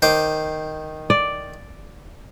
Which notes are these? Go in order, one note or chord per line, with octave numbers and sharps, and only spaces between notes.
D#3 C5 D6
D5